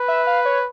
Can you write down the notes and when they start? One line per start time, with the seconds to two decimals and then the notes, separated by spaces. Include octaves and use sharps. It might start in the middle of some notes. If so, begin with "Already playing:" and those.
Already playing: B4
0.08 E5
0.27 F5
0.46 C#5